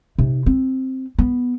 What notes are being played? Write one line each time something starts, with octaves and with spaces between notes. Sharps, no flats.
C3 D#4
C4
B3